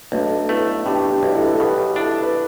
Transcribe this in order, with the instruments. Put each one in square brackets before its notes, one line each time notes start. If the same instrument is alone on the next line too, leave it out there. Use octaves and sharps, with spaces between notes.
[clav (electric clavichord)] B1 [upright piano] A3 D4
[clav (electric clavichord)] A3 [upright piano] B3 E4
[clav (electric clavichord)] A2 [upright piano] D4 G4
[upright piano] D4 G4
[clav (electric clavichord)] B1
[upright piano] B4
E4 A4
A4
[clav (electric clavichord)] B2 [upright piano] G4 B4
[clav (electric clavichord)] D4 [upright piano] E4 A4
[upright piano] B4